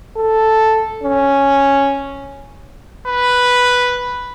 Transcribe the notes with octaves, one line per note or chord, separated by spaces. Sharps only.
A4
C#4
B4